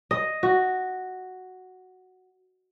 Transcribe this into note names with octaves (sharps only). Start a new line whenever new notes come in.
D#5
F#4